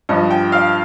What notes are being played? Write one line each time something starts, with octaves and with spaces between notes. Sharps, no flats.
G2 F3 D#5
G5
F5